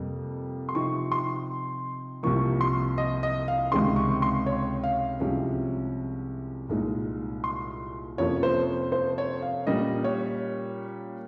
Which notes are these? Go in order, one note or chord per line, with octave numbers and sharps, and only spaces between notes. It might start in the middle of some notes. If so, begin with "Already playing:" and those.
Already playing: F2 C3 G3 A#3
C6
C3 F3 C4 D#4 C#6
C6
C2 C3 F3 A#3 C#6
C6
D#5
D#5
F5
C#2 C3 D#3 G#3 C#4 C6
C#6
C6
C#5
F5
C2 C3 F3 G#3 C#4
C2 A#2 G#3 D#4
C6
F2 C3 F3 A#3 C#4 C#5
C5
C5
C#5
F5
A#2 G3 A#3 C#4 D#5
C#5